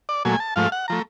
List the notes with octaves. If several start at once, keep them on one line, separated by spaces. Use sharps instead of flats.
D5
A#2 F#3 A3 G#5
A5
G#2 F3 A3 F5
F#5
F3 A3 A#5